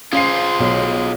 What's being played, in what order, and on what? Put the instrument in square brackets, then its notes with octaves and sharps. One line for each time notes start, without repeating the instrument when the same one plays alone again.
[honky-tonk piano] C#4 F5 C7 [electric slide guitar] F4 G#4 [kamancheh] C5 C6
[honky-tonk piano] B1